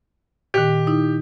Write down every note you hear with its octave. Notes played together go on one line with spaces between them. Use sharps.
A#2 D#3 G4
D#4 E4